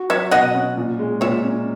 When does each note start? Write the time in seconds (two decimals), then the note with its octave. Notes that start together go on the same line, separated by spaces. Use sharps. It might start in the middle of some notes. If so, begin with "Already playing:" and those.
Already playing: F#4
0.10 F#3 C#5 E5
0.31 B2 D#5 F#5
0.54 C#4
0.77 A#2
0.99 G#3
1.21 A#2 C#5 E5
1.44 C#4